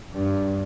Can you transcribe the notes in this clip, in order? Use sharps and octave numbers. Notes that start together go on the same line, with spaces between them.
G2